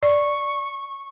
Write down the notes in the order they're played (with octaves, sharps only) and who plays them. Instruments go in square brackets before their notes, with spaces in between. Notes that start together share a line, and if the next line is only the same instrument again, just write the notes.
[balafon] D5 [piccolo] C#6